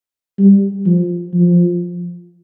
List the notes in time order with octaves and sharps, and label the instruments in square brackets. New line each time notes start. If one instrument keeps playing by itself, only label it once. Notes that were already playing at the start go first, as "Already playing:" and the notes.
[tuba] G3
F3
F3